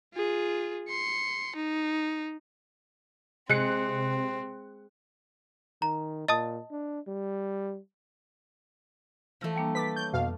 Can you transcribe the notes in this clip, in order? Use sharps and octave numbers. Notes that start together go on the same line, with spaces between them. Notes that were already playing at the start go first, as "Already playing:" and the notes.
F4 G#4
C6 C#7
D#4
C3 G#3 C4 F#6 C#7
D#3 A#5
A#2 D#5 A5 D#6
D4
G3
E3 F3 A3 E6 A#6
G3 A#3 D4
B4 D6 A6 B6
C#5 G6
F2 B2 F5